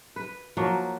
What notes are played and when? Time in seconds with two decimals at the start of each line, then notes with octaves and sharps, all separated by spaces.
0.16 B4
0.57 F3 F#3 A#3 F#5